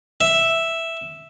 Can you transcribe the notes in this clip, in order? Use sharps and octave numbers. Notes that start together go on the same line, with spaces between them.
E5